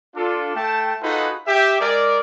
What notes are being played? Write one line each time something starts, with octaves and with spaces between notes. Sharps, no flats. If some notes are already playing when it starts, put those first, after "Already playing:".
D4 F4 A4
A3 G5 A5
D#4 F4 F#4 G#4 A4 B4
G4 E5
G#3 G#4 A#4 D5